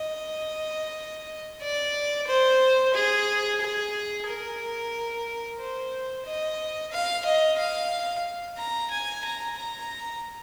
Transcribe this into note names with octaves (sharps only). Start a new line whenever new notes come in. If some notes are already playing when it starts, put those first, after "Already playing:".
Already playing: D#5
D5
C5
G#4
G#4
A#4
C5
D#5
F5
D#5
F5
A#5
G#5
A#5
A#5